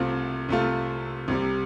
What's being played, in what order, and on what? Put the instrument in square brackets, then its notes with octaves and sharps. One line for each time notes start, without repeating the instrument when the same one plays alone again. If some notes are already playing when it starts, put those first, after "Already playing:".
Already playing: [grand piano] C2 C3 A3 C4 F4
C2 C3 A3 F4
C2 C3 G3